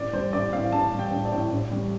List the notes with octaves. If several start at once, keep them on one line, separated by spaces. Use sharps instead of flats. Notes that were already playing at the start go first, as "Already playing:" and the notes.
Already playing: A1 D5
G3 C5
A1 D5
A2 F5
A1 A5
G3
G5
A1
D5
A2
A1
G3